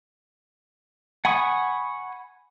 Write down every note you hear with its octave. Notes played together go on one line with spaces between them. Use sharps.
F#5 G#5 B5 C#6 D#6